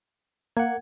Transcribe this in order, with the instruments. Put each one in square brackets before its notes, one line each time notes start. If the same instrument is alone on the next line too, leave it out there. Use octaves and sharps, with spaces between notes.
[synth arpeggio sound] A#3 [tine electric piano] F#5 G#6